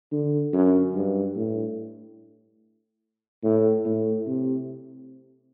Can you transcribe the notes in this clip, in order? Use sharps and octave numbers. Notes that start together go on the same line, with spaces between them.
D3
F#2
G2
A2
A2
A2
C3